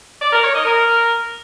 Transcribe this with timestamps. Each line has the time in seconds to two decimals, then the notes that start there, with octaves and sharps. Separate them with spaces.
0.22 D5
0.33 A#4
0.44 C#5
0.54 D#5
0.65 A#4